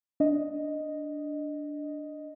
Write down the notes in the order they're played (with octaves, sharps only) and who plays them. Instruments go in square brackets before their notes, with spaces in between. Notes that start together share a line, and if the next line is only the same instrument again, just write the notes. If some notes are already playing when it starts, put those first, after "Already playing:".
[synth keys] D4 D#5